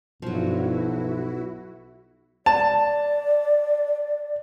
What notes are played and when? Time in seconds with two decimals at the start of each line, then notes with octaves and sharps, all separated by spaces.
0.22 B1 G2 F3 F#3 E4 F#4
2.46 D5 A5